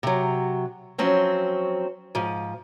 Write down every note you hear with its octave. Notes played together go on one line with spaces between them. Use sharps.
C3 F#3
F3 F#3 C4 C#4
G#2 F3